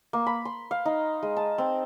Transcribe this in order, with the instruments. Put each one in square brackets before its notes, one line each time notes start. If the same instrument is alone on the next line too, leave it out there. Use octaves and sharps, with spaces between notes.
[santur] A#3
B5
C6
F5
D#4
G#3
A5
C4